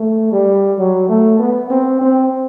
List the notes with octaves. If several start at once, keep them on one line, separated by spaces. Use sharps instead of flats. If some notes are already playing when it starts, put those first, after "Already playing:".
Already playing: A3
G3
F#3
A3
B3
C4
C4